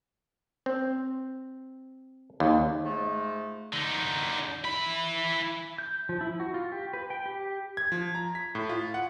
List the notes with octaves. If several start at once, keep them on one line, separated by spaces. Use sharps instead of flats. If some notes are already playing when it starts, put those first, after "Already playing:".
C4
D#2
G#2 F3 G#3 A3
D3 D#4
E3 B5
G6
F3
E4
F#4
F4
G4
B4
G5
G4
G#6
F3
A#5
B6
A2
F4
F#5